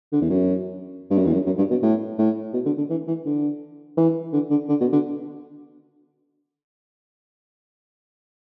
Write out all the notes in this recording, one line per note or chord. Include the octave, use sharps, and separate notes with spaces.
D3
E2
F#2
G2
F#2
E2
F#2
F#2
G2
B2
A2
A2
B2
D3
D3
E3
E3
D3
E3
D3
D3
D3
B2
D3